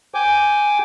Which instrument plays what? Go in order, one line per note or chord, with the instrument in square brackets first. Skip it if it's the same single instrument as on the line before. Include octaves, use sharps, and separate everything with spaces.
[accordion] G5 G#5 D6